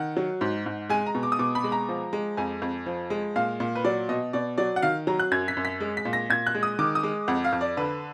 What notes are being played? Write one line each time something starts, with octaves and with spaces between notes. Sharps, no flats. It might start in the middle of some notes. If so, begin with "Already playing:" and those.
Already playing: D#3 F#5
F#3
G#2
G#2
G#3 G#5
A#5
B2
D6
D#6
B2 D6
B5
G#3
A#5
F3
G#3
F2 G#5
F2
F3
G#3
A#2 F5
A#2
B4
F#3 D5
B2 D#5
B2 D5
F#3 D5
F#5
D#3 F5
F#3 A#5
F#6
F#2 G#6
B6
F#2
B6
G#3
B6
A#2
A#6
A#2 G#6
F#6
G#3
D#6
D#3 D6
D#6
G#3
F2 F#5
F5
F2
D5
D3 B4